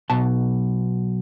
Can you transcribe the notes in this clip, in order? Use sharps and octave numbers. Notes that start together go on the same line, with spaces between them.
B1 B2 A5